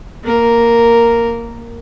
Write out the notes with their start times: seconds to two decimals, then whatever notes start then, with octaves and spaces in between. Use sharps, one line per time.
0.24 A#3 A#4